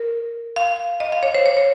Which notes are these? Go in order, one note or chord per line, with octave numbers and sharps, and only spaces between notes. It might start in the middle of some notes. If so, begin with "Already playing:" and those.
Already playing: A#4
F5
D#5
F5
C#5
C5
C#5
C#5